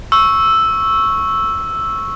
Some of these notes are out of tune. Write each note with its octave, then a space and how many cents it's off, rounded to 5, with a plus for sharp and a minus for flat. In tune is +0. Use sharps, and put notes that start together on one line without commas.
C#6 -5 E6 +0